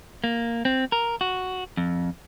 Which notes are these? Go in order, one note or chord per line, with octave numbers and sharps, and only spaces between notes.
A#3
C4
A#4
F#4
F2